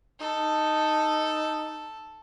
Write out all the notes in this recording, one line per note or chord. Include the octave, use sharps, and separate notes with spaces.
D#4 A4